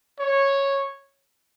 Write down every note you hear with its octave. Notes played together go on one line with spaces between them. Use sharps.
C#5